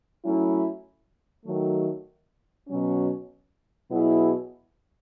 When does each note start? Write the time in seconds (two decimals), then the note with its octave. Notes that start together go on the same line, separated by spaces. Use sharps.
0.24 F#3 A3 C#4 E4
1.46 D#3 F#3 A3
2.68 B2 F#3 C#4
3.90 B2 F#3 B3 E4 G#4